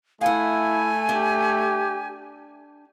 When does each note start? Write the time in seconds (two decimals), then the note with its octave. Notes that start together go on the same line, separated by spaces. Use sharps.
0.21 A3 E4 F5 F#5 G#5
1.09 D4 G4